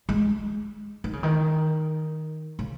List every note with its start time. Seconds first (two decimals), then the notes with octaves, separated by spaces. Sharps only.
0.09 G#3
1.04 D#3
1.13 C#3
1.23 D#3
2.59 C#3